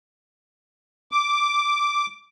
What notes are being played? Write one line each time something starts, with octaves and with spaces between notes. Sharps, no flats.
D6